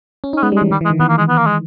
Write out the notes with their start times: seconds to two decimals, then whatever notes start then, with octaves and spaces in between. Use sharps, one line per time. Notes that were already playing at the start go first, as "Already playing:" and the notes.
0.24 C#4
0.33 D#4
0.37 C#4
0.43 G#3 B3
0.52 G3
0.57 G#3
0.62 E3
0.71 D#3 G3
0.81 E3
0.85 G#3
0.90 D#3
1.00 E3 B3
1.09 A#3
1.18 G#3
1.28 B3
1.37 A#3
1.46 G#3